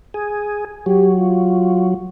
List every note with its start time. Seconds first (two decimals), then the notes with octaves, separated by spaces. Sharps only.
0.14 G#4
0.86 F#3 G4
1.18 F4